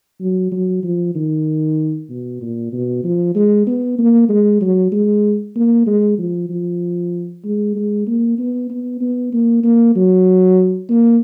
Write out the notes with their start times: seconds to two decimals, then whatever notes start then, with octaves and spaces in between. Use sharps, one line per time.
0.20 F#3
0.52 F#3
0.83 F3
1.15 D#3
2.10 B2
2.41 A#2
2.73 B2
3.04 F3
3.35 G#3
3.67 B3
3.99 A#3
4.29 G#3
4.61 F#3
4.92 G#3
5.56 A#3
5.87 G#3
6.18 F3
6.50 F3
7.44 G#3
7.75 G#3
8.07 A#3
8.38 B3
8.70 B3
9.01 B3
9.33 A#3
9.64 A#3
9.96 F#3
10.90 A#3